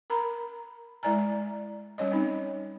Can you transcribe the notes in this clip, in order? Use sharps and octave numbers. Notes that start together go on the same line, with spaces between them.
A#4 A#5 B5
G#3 E4 D5 G#5 A#5
G3 C#4 C#5 D#5
C4 D#4